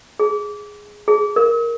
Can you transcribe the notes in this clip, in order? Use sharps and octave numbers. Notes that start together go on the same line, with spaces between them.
G#4
G#4
A#4